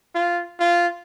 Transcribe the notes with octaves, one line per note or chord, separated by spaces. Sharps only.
F4
F4